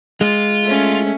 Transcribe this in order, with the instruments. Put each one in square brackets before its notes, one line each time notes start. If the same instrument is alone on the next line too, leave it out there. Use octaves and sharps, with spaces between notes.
[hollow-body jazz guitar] G#3 [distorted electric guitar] F4
[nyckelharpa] A3 C#4